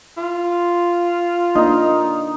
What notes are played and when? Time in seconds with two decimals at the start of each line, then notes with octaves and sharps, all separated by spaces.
0.17 F4
1.55 A#3 D4 D#4